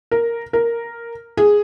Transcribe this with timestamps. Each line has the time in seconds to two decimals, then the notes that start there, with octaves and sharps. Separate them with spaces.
0.11 A#4
0.53 A#4
1.37 G#4